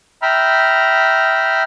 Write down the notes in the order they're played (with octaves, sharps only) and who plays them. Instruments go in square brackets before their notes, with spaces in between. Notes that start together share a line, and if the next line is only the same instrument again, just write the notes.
[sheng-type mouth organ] E5 G5 A#5 B5 F6